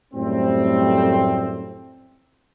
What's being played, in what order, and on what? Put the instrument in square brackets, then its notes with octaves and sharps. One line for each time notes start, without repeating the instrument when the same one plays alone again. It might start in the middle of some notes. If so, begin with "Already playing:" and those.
[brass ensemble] F#2 A2 G3 A3 C4